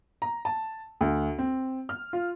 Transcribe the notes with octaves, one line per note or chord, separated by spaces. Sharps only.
A#5
A5
D2
C4
F6
F4